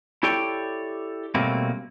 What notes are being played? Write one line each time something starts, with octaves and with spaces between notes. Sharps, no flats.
E4 G4 A4 C#5 D5 G5
B2 G3 A3 A#3 C4 C#4